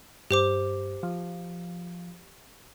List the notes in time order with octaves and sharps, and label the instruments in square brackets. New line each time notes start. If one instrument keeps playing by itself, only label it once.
[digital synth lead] G2 [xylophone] G4 C5 D6
[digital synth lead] F3